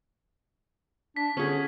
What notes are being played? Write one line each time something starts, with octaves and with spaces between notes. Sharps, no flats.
D4 B6
D3 C#4 G#4